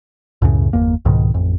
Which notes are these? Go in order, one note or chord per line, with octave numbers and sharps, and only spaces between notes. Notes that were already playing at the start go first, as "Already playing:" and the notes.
C#2 F#2 A2 C#3
G1 E2 A#3
C2 G#2 B2 D#3
A1 F2